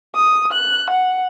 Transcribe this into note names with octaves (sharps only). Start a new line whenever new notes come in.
D#6
F#6
F#5